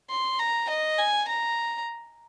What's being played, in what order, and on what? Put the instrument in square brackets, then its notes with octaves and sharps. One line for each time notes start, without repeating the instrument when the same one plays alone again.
[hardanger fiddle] C6
A#5
D#5
G#5
A#5